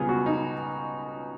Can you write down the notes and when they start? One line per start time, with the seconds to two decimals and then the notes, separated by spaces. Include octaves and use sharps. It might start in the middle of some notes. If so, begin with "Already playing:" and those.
Already playing: C#2 B2 G3 B3 F4 G#4
0.09 F#4
0.26 D#4